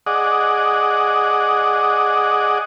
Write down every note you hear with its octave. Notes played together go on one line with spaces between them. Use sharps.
G#4 D5 D#5 F#5